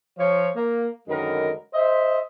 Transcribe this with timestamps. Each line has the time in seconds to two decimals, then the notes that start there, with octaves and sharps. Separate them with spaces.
0.18 F3 C#5
0.55 A#3
1.08 F#2 D3 D#3 G#3 A#4 B4
1.73 C5 D#5 E5